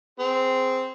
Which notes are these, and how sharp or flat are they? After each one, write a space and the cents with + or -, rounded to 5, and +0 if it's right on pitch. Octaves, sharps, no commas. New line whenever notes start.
C4 -10 G#4 +0